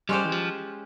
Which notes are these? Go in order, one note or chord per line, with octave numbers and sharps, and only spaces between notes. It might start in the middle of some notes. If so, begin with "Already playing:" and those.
G3 G#3 C#4 G4 C5
E3
F3